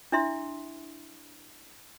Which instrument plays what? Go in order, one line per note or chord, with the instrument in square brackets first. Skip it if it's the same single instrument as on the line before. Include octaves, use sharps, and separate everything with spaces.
[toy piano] D4 E4 E5 C6